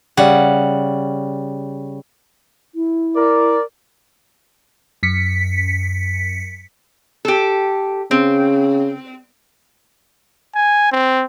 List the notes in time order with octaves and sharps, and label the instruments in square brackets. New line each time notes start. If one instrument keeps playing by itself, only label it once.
[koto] C#3 G3 F#5
[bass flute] E4
[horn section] A#4 D5
[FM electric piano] F#2 B6 C#7
[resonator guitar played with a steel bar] G4 A4
[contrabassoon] C#3 [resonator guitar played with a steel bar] C4
[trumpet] G#5
C4